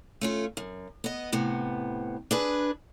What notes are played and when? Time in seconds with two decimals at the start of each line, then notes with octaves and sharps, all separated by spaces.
0.21 A3 C#4 F4
0.57 F#2
1.04 B3 D#5
1.32 A2 C3 B3
2.31 D4 G#4 B4